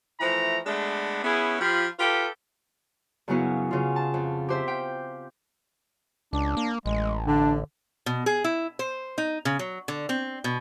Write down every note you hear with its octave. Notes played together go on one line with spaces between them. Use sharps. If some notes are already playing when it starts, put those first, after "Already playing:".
E3 F3 A3 A#5
G#3 A3 B3 D4
B3 C#4 E4 G#4
F3 F4 G4 B5
F4 G4 A4 B4
F#2 C#3 F#3 B3 E4 F5
C#3 F4
A5
F2
G4 C5 E5
F5 G5
C#2 D4
A#3
A1 G#3
D3 D4
B2
G#4
E4
C5
D#4
C#3
F#3
D3
C4
B2